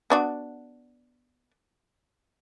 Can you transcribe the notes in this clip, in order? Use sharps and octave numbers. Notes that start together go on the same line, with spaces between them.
B3 D4 F#4